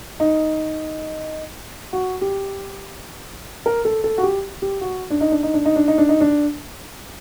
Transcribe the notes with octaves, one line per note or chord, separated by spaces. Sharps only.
D#4
F#4
G4
A#4
A4
A4
F#4
G4
G4
F#4
D4
D#4
D4
D#4
D4
D#4
D4
D#4
D4
D#4
D4